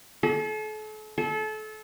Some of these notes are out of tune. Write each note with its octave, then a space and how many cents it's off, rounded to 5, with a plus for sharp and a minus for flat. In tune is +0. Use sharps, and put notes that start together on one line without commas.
A4 -40
A4 -30